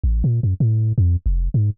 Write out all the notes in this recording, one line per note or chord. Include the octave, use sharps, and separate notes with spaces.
A1
A#2
F#2
A2
F2
F1
G#2